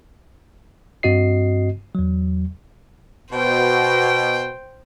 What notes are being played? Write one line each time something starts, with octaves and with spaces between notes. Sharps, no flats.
G2 C4 F#4 D#5 C7
E2 F#3
B2 C5 G5